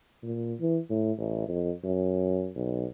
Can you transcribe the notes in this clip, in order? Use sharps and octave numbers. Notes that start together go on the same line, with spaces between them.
A#2
E3
A2
A1
F2
F#2
B1